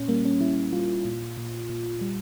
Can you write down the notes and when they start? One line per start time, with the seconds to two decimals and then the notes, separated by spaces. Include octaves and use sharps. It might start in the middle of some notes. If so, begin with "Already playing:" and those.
Already playing: A#2 C#4
0.08 G3 A#3
0.25 C#4
0.41 G3 E4
0.73 G3 F4
1.05 A#2
1.37 A#2
1.69 A#2
2.01 G3